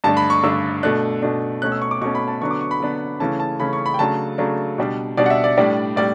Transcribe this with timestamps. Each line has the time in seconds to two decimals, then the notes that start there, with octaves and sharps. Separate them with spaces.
0.04 G2 D3 A3 D4 A5
0.17 B5
0.30 C#6
0.43 G2 D3 A3 D4 E6
0.83 B2 A3 D4 F#6
1.22 B2 A3 D4
1.62 B2 A3 C#4 F#6
1.72 E6
1.82 C#6
1.91 D6
2.01 B2 A3 C#4 C#6
2.15 B5
2.28 A5
2.42 D3 F#3 B3 D4 C#6
2.51 D6
2.61 C#6
2.71 B5
2.80 D3 F#3 B3 D4
3.20 C#3 E3 A3 C#4 A5
3.40 A5
3.59 C#3 E3 A3 C#4 B5
3.73 C#6
3.86 B5
3.94 G5
3.99 C#3 F#3 A3 D4 A5
4.38 C#3 F#3 A3 D4
4.78 B2 G3 D4
5.17 B2 G3 D4 D5
5.26 F#5
5.30 E5
5.44 D5
5.57 A2 G3 D4
5.96 A2 G3 D5